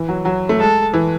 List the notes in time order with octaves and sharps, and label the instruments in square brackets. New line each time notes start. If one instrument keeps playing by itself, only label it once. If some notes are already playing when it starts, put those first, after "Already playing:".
Already playing: [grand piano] E3
F#3
F#3
A3
[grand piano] G#3 [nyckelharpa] A4
[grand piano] E3